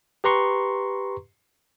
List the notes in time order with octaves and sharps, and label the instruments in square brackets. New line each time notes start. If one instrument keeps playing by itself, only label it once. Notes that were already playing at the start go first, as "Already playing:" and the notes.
[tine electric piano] G4 B4 A#5 C6 C#6